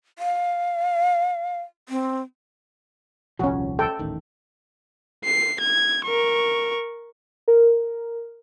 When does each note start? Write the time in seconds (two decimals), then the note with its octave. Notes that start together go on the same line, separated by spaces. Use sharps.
0.19 F5
1.89 C4
3.39 D#1 C2 F3 C#4 F#4
3.79 A4 G5
3.99 D#1 A1 D#3
5.25 C7
5.61 G#6
6.05 A#4 C#6
7.48 A#4